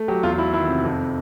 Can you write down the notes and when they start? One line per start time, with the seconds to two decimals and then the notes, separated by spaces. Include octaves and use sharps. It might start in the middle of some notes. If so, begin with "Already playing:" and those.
Already playing: A3
0.08 F#3 G4
0.23 E2 F4
0.38 F#3 E4
0.54 D#3 E4
0.69 C3
0.84 F2